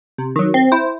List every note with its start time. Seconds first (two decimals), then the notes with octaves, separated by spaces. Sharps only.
0.18 C3
0.36 D#3 F#3
0.54 C4
0.72 E4 C5